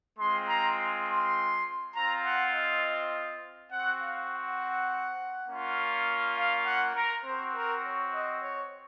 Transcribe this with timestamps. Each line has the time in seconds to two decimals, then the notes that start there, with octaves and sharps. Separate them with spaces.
0.18 G#3 C4 F4 C6
0.48 A#5
1.07 C6
1.95 C4 F4 A#5
2.24 F#5
2.54 D#5
3.71 C4 F#4 F#5
4.01 F5
4.31 F#5
5.48 A#3 C#4 F4
6.37 F5
6.65 F#5
6.95 A#4
7.24 C4 F#4 C5
7.54 A#4
7.83 C#5
8.13 D#5
8.42 C#5